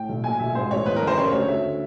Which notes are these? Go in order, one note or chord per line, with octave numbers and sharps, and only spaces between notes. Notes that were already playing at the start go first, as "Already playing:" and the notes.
Already playing: A2 G5
B1
A#2 G#5
B1 E5
G#2 C5
A1 C#5
E2 B4
A#4
F#1
C5
C#3 C#5
D2 C#5
D2 E5